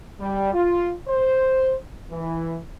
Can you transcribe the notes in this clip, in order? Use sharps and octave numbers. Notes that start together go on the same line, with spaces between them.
G3
F4
C5
E3